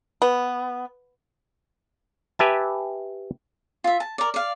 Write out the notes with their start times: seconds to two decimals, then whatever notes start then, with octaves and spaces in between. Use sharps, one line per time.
0.22 B3
2.39 G4 B4 E5 G#5 A5
3.84 F4 E5
4.00 A5
4.18 A#4 D5
4.34 D5 F5